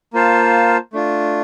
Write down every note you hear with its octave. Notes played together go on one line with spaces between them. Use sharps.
A#3 F4 C5 F5 A5
A3 D4 F4